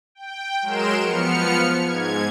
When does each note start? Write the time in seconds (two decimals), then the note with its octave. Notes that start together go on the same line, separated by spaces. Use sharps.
0.15 G5
0.62 F#3 G#3 A#4 C6 D7 E7
1.01 F3 B3 F6 C#7
1.81 G#2 G#6